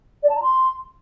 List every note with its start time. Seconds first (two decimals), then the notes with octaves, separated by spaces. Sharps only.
0.23 D5
0.29 A5
0.36 A#5
0.42 C6